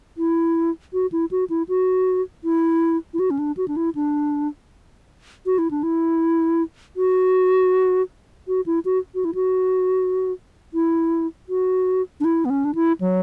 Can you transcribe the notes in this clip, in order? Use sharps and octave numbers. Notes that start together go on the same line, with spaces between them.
E4
F#4
E4
F#4
E4
F#4
E4
E4
F#4
C#4
D4
F#4
D4
E4
D4
F#4
E4
D4
E4
F#4
F#4
E4
F#4
F#4
E4
F#4
E4
F#4
D4
E4
B3
C#4
D4
E4
F#3